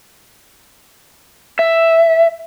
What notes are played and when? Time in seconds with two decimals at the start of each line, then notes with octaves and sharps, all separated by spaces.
1.59 E5